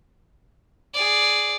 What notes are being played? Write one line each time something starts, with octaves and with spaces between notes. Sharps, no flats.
G#4 D5